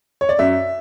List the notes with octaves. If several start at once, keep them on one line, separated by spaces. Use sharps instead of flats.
C#5
D5
F#2 E5